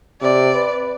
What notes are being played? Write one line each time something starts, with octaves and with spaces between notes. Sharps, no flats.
C3 D5
B4